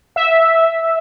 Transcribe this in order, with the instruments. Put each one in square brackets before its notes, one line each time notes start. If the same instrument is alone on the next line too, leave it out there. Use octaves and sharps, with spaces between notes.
[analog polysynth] E5